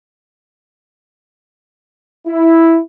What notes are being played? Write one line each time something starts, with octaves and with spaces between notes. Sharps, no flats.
E4